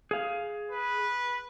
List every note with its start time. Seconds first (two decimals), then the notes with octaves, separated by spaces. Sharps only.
0.11 G#4 F5
0.71 B4